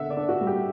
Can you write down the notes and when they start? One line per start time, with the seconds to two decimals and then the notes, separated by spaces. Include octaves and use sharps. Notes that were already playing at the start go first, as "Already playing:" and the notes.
Already playing: D3 B3 E5 F#5
0.10 D5
0.17 D4
0.29 F#4
0.41 G3
0.47 G4